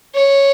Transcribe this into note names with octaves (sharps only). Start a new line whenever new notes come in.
C#5